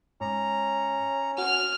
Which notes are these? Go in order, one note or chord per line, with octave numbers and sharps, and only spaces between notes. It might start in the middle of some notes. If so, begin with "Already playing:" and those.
G#2 C#4 A#5
F#4 F6